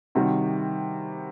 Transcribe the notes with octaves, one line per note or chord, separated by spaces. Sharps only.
C3 D#3 G3 F#4